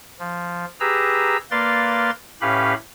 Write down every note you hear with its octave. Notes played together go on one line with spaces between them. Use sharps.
F3
G4 G#4 B4 A#5 E6
A#3 B4 D5 F5 C6 A6
A2 C#4 G4 B4 F5 B5